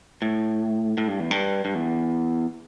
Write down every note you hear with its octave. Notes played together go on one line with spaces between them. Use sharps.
A2
A2
G2
E2
G2
G2
E2